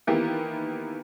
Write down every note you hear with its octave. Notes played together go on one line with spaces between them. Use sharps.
D#3 E3 A#3 B3 E4 G4